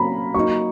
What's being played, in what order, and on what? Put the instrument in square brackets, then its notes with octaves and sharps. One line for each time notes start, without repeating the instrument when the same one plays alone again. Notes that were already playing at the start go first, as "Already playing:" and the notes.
Already playing: [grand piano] F#3 A#3 C#4 [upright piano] A#5 B5
[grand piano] F#3 A#3 D#4 [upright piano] C#6